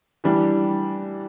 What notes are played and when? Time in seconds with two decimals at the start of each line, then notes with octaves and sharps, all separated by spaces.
0.24 E3 G3 D4